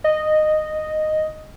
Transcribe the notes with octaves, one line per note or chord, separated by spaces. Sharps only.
D#5